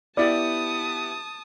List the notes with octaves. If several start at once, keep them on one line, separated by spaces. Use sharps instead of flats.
B3 E4 G4 D5 A5 D#6